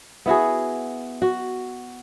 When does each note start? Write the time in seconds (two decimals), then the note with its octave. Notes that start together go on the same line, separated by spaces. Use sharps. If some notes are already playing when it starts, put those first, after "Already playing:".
0.26 B3 E4 F#4 G#4
1.22 F#4